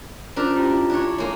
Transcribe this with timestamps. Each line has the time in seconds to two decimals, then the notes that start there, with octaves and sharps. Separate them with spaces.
0.36 C#4 D4 F4 A#4 C5 D5
0.56 E4 F4 G4
0.90 D4 C#5
1.18 G#3 A#3 C#5